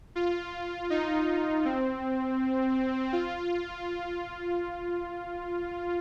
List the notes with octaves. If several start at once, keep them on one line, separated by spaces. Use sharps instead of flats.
F4
D#4
C4
F4